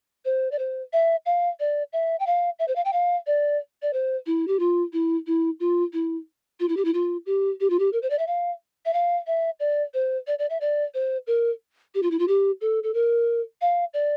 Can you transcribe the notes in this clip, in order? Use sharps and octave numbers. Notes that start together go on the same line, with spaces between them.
C5
D5
C5
E5
F5
D5
E5
G5
F5
E5
C5
F5
G5
F5
D5
D5
C5
E4
G4
F4
E4
E4
F4
E4
F4
E4
G4
E4
F4
G4
G4
F4
G4
A#4
C5
D5
E5
F5
E5
F5
E5
D5
C5
D5
D5
E5
D5
C5
A#4
G4
F4
E4
F4
G4
A4
A4
A#4
F5
D5